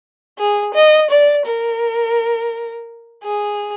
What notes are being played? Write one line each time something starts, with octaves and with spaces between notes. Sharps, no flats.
G#4
D#5
D5
A#4
G#4